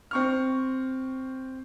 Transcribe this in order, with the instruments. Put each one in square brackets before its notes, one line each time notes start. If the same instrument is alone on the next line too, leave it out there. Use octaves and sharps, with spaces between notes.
[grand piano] C4 C#6 F6